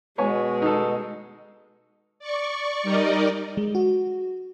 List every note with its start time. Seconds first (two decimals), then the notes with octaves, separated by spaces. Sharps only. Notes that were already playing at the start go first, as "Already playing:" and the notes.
0.18 B2 G#3 B3 C#5 G#5
0.62 D#4 A4
2.19 D5 C#6
2.83 G3 D#4 A#4 D5 D#5
3.57 G#3
3.75 F#4